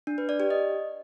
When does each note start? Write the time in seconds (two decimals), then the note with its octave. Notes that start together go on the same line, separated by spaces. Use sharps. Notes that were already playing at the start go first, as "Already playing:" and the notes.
0.07 D4
0.18 B4
0.29 D5
0.40 G4
0.51 D#5